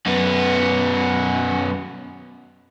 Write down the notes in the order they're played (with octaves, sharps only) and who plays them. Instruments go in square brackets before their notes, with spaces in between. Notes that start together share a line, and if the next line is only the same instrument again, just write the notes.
[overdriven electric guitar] F#2 B3